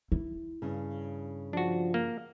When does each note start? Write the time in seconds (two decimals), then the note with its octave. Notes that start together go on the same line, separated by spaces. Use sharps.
0.12 E4
0.62 G2 C#3
1.53 F3 D4 F#4
1.94 A#3